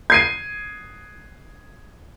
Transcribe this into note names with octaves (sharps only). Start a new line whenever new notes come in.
G#6 C7 D#7